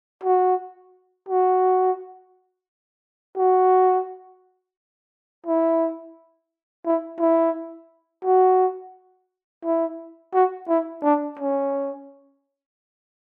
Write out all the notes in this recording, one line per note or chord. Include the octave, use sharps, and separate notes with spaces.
F#4
F#4
F#4
E4
E4
E4
F#4
E4
F#4
E4
D4
C#4